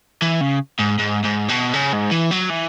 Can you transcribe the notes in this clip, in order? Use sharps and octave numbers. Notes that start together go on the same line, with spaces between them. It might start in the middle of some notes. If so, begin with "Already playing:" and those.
E3
C#3
G#2
G#2
G#2
B2
C#3
G#2
E3
F#3
E3